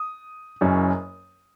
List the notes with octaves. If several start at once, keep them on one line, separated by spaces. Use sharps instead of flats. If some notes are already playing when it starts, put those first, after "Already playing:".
Already playing: D#6
F#1 F#2 F#3 C#4